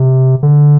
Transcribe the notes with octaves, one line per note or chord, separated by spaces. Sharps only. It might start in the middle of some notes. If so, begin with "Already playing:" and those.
Already playing: C3
D3